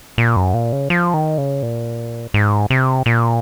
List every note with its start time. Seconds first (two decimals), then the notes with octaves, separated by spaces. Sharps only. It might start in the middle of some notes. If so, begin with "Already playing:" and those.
0.18 A#2
0.36 F#2
0.54 A#2
0.73 C#3
0.90 F3
1.14 D#3
1.38 C#3
1.63 A#2
2.34 G#2
2.70 C3
3.06 A#2